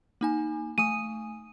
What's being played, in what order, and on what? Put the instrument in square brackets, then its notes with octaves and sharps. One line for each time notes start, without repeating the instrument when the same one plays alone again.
[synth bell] A#3 D#4 G#5
[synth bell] A3 G#5 D#6 [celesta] D#7